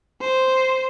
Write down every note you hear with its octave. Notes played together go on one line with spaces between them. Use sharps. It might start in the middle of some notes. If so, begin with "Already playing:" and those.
C5